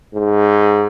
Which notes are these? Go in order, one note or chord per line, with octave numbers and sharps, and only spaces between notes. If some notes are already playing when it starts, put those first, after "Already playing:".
G#2